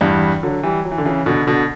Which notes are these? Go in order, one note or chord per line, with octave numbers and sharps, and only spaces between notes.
E2 G2
D3 F#3
E3 G3
F#3
E3
D3
C#3 E3
B2 D3
B2 D3